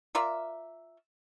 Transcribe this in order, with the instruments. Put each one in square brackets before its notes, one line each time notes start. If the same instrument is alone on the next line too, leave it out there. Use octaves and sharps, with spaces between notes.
[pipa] F4 A#4 D5 E5